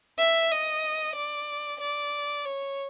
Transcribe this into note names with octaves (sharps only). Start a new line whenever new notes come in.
E5
D#5
D5
D5
C#5